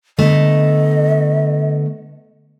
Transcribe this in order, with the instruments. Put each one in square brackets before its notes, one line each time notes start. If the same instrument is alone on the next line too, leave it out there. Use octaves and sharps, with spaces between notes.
[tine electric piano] D3 [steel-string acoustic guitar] A3 B3 [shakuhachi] D#5